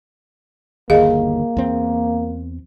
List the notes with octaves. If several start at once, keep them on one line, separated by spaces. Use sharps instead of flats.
G1 D#2 A#3 G#4 D#5 F5
E2 C4